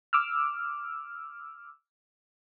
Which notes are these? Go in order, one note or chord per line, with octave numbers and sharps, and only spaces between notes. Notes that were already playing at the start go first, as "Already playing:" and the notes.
D6 E6 F6